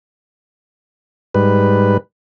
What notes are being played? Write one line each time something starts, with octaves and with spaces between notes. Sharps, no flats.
G#2 G3 B4